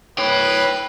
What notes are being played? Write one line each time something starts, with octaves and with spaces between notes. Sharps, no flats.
B4 C#5 G5